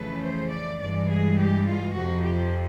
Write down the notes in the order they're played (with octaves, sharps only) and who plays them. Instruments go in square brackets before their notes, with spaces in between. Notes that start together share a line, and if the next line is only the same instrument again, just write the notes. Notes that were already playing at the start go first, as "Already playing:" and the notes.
Already playing: [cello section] F2 C#3 E3 A3 B4
C5
D5
G2 E3 G#3 D5
G#4
G4
F4
F2 C3 F3 F#4
G4